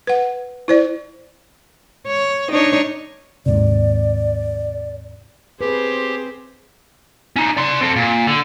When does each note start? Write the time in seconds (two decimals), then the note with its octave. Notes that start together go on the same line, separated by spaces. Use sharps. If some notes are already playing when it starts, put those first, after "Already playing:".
0.07 B4 F#5
0.68 E4 C5 D5
2.07 C#5
2.50 D4 D#4 C#5
3.46 D#2 G#2 C3 D5
5.61 C4 G4 G#4 B4 C5
7.36 C#4 D#4
7.57 D5 C6
7.81 C4 A4
7.96 A#2
8.27 D3